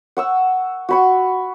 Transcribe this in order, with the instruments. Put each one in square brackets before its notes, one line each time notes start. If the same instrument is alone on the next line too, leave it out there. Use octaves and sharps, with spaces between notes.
[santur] F#5 C#6 E6
F#4 B5 C#6